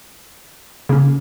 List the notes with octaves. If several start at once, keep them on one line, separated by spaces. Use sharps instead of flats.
C#3 A#3 C#4